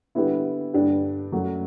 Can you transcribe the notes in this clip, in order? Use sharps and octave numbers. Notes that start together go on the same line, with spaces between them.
D3 G3 B3 E4
G2 D3 G3 D4 G4
F#2 F#3 A3